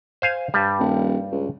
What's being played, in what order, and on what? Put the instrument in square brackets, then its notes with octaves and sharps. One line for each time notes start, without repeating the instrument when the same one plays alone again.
[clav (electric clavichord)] C5 F5 G#5
G2 G3
[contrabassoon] D#1
C#2